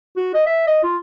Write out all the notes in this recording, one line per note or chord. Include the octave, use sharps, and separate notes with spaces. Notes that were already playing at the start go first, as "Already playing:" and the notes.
F#4
D#5
E5
D#5
F4